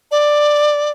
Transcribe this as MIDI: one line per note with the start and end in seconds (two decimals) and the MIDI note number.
0.11 0.91 74